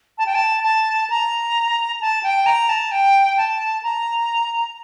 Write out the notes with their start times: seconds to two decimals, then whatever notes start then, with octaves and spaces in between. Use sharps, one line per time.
0.18 A5
0.26 G5
0.35 A5
0.64 A5
1.10 A#5
2.01 A5
2.23 G5
2.46 A#5
2.69 A5
2.92 G5
3.38 A5
3.83 A#5